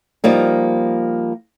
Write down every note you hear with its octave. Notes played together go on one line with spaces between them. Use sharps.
F3 G3 A#3 D#4